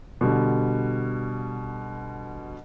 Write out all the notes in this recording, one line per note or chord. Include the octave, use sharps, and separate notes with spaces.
B2 D3 G3